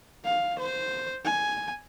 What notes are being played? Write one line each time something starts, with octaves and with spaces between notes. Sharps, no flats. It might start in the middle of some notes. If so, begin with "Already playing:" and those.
F5
C5
G#5